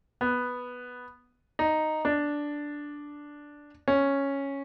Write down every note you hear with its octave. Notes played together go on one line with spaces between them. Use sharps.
B3
D#4
D4
C#4